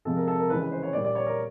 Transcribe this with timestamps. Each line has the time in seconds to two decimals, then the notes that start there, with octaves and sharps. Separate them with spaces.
0.05 C3 F3 G#3 A4
0.16 A#4
0.28 A4
0.39 A#4
0.50 C#3 E3 G#3 B4
0.61 B4
0.72 C5
0.83 C#5
0.93 A#2 G3 D5
1.04 D5
1.15 C#5
1.27 A#4